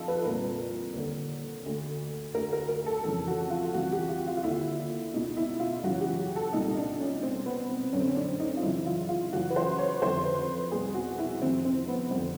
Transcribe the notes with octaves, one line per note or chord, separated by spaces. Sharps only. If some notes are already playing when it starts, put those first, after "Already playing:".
Already playing: F2 D3 D#4 F4 A4
B4
C2 A#2 A#4
D#2 D3
D2 D3
D2 D3 A#4
A#4
A#4
A4
F2 C#3 E3 A4
F#4
F4
C2 C3 E3 F#4
G4
F4
F4
F4
D#2 D3 E4
C#2 B2 D#4
E4
F4
F#2 C#3 E3 F#4
G4
A4
C2 A#2 D#4
D4
C#4
C2 B2 C4
B3
F#2 D3 C#4
C4
C#4
D4
D#4
F4
F#2 C#3 E3 E4
F4
F4
F#2 C#3 E3 F#4
B4
C5
C#5
F2 D3 C5
B4
C2 B2 G#4
F#4
E4
F2 C3 D#3 C4
C4
B3
F2 D3 C4